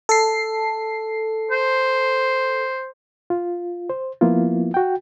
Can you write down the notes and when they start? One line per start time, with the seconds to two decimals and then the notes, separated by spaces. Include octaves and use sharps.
0.09 A4 C7
1.51 C5
3.30 F4
3.90 C5
4.21 F3 A#3 B3 E4 F4
4.74 F#4 G5